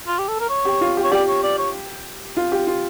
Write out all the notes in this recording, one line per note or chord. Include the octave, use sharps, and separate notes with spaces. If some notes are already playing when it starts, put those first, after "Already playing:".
F4
G4
A4
A#4
C#5
G4
F4
G4
C#5
G4 D5
C#5
D5
C#5
F4
G4
F4